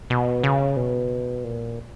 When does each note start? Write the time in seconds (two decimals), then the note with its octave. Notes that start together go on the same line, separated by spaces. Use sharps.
0.10 B2
0.43 C#3
0.77 B2
1.44 A#2